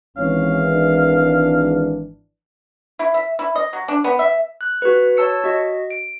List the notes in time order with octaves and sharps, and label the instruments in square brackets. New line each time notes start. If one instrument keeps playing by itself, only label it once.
[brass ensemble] G#1 E3 [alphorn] C#4 [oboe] F5
[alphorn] D4
[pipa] E4
E5
E4
D#5
F#3
D4
B3
E5
[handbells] F#6
F#4 B4
C#5 A5 E6 C#7
F#4 D#5
D7